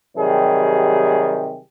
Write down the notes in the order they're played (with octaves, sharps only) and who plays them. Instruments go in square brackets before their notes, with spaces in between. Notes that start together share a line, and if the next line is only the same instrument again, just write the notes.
[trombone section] C3 D#3 F#3 G3 G4 G#4